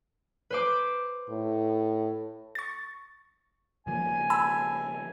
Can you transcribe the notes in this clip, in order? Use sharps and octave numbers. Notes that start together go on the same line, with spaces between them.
B4 C5 D6
A2
C#6 A6
C#3 F3 A#3 G#5
A5 B5 E6